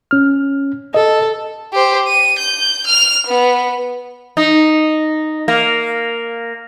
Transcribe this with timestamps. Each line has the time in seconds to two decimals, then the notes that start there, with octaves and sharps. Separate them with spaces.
0.11 C#4 F6
0.94 A4 D#5
1.74 G4 C5
2.08 D#7
2.39 G6
2.87 F6 F7
3.27 B3
4.37 D#4
5.48 A#3